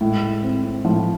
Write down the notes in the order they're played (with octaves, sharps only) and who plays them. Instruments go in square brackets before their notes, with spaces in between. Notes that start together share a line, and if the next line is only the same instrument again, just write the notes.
[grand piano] A2 [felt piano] G#3
[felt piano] C4
[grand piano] A2 [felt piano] F3